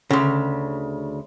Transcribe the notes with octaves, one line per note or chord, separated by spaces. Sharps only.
D2 C#3